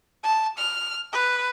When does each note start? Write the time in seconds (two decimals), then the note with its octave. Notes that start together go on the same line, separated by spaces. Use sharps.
0.23 A5
0.58 F6
1.13 B4